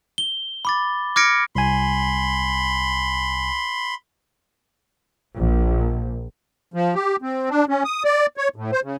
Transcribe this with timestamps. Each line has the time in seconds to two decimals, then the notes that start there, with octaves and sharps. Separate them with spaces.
0.18 G7
0.65 B5 D6 A6
1.16 D6 F6 G#6 A#6 C#7 D7
1.55 C2 G#5 B5 C6
5.37 A#1
6.74 F3
6.95 G4
7.22 C4
7.50 D4
7.69 C#4
7.84 D#6
8.04 D5
8.37 C#5
8.56 A2
8.72 C5
8.84 C#3